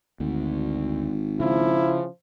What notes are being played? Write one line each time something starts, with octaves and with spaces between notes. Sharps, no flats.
G#1 D2
C#3 F3 E4